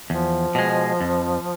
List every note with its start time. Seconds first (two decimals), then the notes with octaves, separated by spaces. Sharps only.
0.10 E2 F3
0.55 B2 G#3
1.01 F2